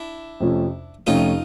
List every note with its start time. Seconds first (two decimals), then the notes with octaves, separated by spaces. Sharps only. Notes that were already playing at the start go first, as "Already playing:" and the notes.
Already playing: D4 E4
0.40 F2 C3 F3 A3 C#4
1.07 F2 C3 F3 A3 C#4 D#4 F4